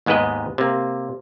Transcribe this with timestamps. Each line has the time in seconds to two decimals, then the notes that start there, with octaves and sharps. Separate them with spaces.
0.06 D#2 G#2 G#3 B3 B4 D#5
0.58 C3 A#3